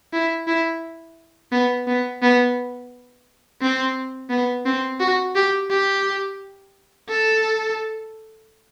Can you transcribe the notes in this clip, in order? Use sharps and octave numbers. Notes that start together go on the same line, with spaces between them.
E4
E4
B3
B3
B3
C4
B3
C4
F#4
G4
G4
A4